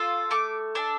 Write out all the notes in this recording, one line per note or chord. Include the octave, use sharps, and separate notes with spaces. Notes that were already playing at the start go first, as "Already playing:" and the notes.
Already playing: F4 A4
A3 D6
D4 A4